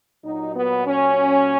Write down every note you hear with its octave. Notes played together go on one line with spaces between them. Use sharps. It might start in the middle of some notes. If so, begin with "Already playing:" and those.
A#2 F#3 D#4
B3
C#4